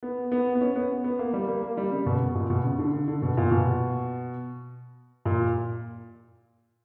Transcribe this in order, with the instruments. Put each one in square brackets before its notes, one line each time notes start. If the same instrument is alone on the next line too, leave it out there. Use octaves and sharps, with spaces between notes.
[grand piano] B3
B3
B3
C#4
B3
B3
A#3
G3
A#3
A#3
G3
C#3
B2
A#2
B2
C#3
D3
D3
D3
B2
A#2
B2
A#2